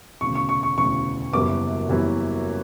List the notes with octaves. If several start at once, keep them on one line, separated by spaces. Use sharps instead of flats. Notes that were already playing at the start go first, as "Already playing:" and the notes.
E1 D2 C#3 C#6
C#6
C#6
C#6
E1 D2 C#3 C#6
F#1 F#2 E3 G3 B3 D6
F#1 F#2 E3 G3 B3